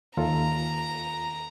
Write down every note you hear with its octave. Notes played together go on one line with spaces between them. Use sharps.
D#2 F4 A4 A#5